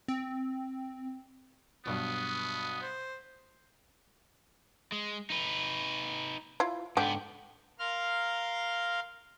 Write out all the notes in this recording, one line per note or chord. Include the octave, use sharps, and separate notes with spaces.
C4
G2 B2 F#3 B3 D#6
C5
G#3
D#4 B4
E4 F4
G#2 D3 B3 G4
A#4 F5 C6 F6